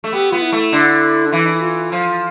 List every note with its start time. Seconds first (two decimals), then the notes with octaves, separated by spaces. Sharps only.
0.04 A3
0.12 B3 G4
0.31 B3 F4
0.42 E4
0.53 A3
0.72 D3
1.26 D4
1.32 E3 E4
1.46 D4
1.54 E4
1.61 F4
1.92 F3